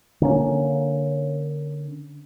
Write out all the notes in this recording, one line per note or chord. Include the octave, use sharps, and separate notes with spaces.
D3 A#3 C#4